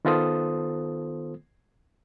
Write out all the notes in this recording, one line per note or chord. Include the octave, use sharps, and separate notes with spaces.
D#3 B3 F4 A4 C5 D#6